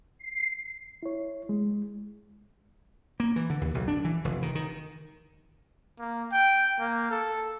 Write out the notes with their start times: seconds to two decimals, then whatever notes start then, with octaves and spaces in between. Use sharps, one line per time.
0.18 C7
1.03 E4 C#5
1.49 G#3
3.20 A#3
3.36 E3
3.50 D3
3.61 D#2
3.74 B1
3.88 D4
4.05 E3
4.25 F1
4.42 D#3
4.55 D#3
5.99 A#3
6.32 G5
6.80 A#3
7.11 A4